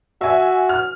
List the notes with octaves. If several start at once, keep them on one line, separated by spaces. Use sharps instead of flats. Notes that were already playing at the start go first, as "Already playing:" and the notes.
F#4 E5 G#5
F6